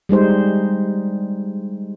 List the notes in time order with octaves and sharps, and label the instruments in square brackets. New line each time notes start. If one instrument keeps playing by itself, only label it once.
[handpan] G3 G#3 D#4 C5